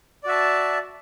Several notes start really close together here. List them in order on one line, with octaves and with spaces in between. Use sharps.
D5 F#4 E5 A5